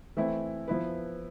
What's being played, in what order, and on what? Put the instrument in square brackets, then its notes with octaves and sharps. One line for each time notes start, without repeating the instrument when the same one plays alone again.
[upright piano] E3 A3 C4 E4
F3 B3 E4 B4